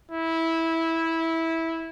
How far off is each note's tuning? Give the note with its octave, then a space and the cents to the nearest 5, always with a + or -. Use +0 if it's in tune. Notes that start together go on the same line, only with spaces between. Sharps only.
E4 -15